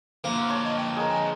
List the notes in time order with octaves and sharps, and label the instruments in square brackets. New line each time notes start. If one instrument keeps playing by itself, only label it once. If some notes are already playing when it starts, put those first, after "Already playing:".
[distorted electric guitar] D3 F3 [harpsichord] A#3
[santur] C#5 A5
[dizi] D#5
G5
[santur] G#4 A#4 [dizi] D#5